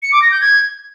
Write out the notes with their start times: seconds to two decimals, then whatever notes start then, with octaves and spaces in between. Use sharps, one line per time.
0.03 C#7
0.12 D6
0.22 A#6
0.31 G6
0.41 G#6